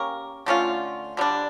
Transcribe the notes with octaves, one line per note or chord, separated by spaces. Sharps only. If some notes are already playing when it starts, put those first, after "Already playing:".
Already playing: A#3 C#4 G4 A#4
D3 A3 C#4 F4
D3 G3 D4